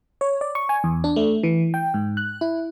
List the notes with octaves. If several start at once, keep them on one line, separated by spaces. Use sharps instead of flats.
C#5
D5
C#6
G#5
E2
D4
A3
E3
G5
G#2
F#6
E4